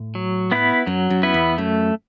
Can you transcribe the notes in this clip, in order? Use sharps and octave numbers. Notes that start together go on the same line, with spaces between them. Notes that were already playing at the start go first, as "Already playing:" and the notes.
Already playing: A2
F#3
B3 E4 B4
F#2 F#3
F#2
B3 E4 B4
E2
F#2 A3